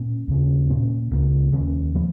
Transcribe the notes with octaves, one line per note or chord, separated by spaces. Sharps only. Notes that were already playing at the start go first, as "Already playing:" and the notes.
Already playing: A#2 A#3 C#4
D#2 C#3 A#3 C#4
A#2 A#3 C#4
C#2 C#3 A#3
D#2 D#3 A#3 C#4
F3 A#3